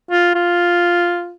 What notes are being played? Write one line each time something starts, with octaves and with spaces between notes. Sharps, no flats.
F4
F4